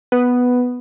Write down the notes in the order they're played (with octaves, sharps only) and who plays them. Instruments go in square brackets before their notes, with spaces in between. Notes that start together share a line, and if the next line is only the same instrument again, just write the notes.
[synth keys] B3